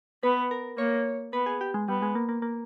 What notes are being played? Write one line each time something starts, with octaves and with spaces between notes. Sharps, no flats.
B3 B4
A#4
A#3 C#5
B3 B4
G#4
G4
G#3
G3 B3
G#3
A#3
A#3
A#3